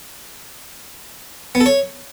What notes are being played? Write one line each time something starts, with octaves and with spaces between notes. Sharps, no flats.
B3
A4
C#5